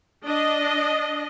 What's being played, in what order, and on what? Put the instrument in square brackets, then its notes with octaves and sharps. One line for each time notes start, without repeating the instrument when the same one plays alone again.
[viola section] D4 D#5